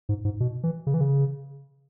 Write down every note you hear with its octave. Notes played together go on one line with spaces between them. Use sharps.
G#2
G#2
B2
E3
C#3
E3
C#3